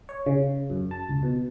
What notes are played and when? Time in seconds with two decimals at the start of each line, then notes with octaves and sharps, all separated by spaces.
0.09 C#5
0.26 C#3
0.70 F#2
0.91 A5
1.09 C#2
1.23 B2